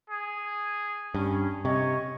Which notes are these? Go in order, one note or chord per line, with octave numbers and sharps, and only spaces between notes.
G#4
G2 C#4
C3 C#5 D#5 C#6